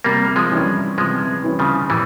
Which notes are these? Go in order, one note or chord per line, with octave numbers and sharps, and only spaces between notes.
C3 G3 A#3
F3 G#3
E3 G3 C#4 E4
C3 F3 G#3
E3 G3 C#4 E4
C#3 F3
A#2 E3 G3